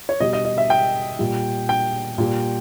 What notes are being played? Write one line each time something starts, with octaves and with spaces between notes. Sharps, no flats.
C#5
B2 G3 D#5
D#5
D#5
E5
G5
A#2 G3
G5
A#2 G3